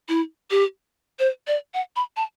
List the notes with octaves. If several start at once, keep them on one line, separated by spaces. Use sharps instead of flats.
E4
G4
C5
D5
F#5
B5
A5